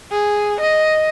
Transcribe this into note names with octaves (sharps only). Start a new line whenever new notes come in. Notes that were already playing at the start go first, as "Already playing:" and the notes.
G#4
D#5